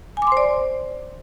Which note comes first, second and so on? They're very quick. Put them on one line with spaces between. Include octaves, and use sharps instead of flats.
G#5 D6 C6 C5 D5